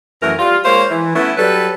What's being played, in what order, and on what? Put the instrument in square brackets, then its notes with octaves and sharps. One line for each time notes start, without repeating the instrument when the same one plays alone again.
[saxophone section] F#2 E3 A3 A#4
G3 F4
G#3 A#3 C5 C#5 F5
E3
A3 B3 C#4 E4
F#3 G3 A4 B4